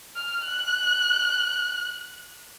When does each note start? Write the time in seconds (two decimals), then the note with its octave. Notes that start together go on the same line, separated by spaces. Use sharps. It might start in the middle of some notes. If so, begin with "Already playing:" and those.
0.16 F6
0.44 F#6